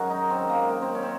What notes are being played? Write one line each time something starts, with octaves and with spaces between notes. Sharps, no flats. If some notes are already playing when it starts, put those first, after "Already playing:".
Already playing: F#2 D#3 F#3 F#4 G#4 A#4
D#4
C4
A#3
A#3
C4
C#4
C4